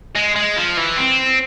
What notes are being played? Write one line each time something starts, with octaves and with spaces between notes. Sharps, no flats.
G#3
G#3
F3
E3
C4